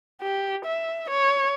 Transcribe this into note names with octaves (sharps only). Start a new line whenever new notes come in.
G4
E5
C#5